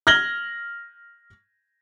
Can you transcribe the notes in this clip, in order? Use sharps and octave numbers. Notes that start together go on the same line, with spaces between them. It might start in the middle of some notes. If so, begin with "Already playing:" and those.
F6 G#6 A#6 F#7 G7